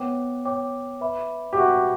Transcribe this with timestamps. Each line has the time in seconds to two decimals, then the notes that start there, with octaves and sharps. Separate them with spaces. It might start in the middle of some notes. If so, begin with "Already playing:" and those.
Already playing: B3 C#5 G5 D6
0.45 C#5 G5 D6
1.01 B4 E5 B5 D6
1.53 G4
1.58 F#4 B4 E5 B5 D6